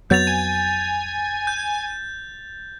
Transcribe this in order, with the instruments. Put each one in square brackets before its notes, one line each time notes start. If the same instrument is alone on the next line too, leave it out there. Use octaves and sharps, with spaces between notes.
[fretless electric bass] F2 F#3 B3 [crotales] G6 A6 F7
[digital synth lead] G#5
[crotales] G6